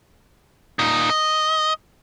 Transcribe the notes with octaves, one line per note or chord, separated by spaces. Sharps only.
A#2 D#4
D#5